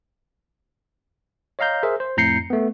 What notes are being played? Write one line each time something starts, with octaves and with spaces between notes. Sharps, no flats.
C#5 D#5 F5 A#5 G6
G#4 A#4 C5 E5
C5
F2 A2 A#5 G6 C7 C#7
A3 B3